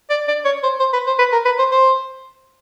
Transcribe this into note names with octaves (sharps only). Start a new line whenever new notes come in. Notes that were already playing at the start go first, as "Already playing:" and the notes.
D5
D5
C#5
C5
C5
B4
C5
B4
A#4
B4
C5
C5